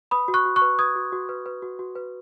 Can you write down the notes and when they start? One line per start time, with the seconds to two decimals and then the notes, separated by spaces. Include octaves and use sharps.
0.11 B4 B5 D#6
0.28 F#4
0.34 C#6 F#6
0.45 F#4
0.56 C#6 F#6
0.62 B4
0.79 B4 D#6 G#6
0.96 F#4
1.12 F#4
1.29 B4
1.46 B4
1.62 F#4
1.79 F#4
1.95 B4